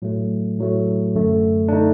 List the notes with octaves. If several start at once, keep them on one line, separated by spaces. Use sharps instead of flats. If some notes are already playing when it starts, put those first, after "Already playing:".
A2 F#3 A3
A2 F#3 A3
F#2 D3 A3
D4
D3 A3 D#4